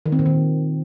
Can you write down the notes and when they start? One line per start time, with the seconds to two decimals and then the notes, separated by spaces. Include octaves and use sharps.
0.06 D#3
0.12 C4
0.19 A#2
0.26 D#3